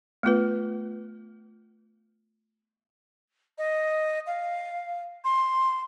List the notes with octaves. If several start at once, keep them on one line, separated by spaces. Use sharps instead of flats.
A3 B3 F4 B4
D#5
F5
C6